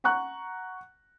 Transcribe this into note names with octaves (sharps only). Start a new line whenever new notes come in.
F#5 A#5 C#6 F#6